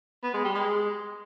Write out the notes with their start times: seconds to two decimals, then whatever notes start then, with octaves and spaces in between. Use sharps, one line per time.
0.23 B3
0.33 G#3
0.44 G3
0.55 G#3